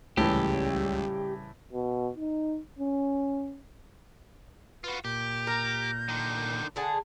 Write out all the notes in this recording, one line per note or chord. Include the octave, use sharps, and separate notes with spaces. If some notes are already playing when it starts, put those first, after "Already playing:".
C#2 A2 C#3 E3 G3 G4
B2
D#4
C#4
F4 F#4 B4
A#2 G4 G6
A#4
D3 D#3
D3 G#4 F#5 A5